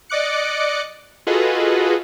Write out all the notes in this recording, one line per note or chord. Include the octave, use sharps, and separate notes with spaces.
D5 D#5 D6 F#6 C#7
F4 F#4 G#4 A4 B4 D#5